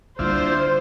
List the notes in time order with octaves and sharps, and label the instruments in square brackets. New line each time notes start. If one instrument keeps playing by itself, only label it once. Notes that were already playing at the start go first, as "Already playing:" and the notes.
[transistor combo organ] D3 E4 F4 [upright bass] G3 A#3 [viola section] C5